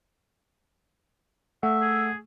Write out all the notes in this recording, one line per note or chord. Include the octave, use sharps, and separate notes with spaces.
A3 E5 F#5
G#4